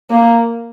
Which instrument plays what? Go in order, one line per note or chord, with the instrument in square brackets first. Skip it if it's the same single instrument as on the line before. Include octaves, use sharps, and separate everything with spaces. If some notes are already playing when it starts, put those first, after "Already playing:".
[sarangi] A#3